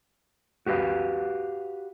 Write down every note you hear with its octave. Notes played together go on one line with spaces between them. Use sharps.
F#4 G4 B4 D#5 F5